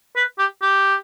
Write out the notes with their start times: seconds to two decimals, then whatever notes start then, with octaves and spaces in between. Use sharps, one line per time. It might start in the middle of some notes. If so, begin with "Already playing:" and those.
0.16 B4
0.39 G4
0.62 G4